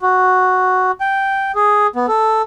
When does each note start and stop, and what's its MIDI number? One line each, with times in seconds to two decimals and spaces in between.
0.01 0.91 66
1.00 1.52 79
1.55 1.87 68
1.96 2.06 59
2.08 2.42 69